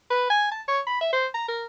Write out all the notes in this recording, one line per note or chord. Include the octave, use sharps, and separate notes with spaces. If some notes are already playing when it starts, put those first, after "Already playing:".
B4
G#5
A5
C#5
B5
E5
C5
A#5
A#4